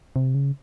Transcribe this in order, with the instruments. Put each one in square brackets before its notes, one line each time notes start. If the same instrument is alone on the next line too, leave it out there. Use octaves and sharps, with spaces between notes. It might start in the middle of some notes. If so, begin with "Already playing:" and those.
[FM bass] C3
C#3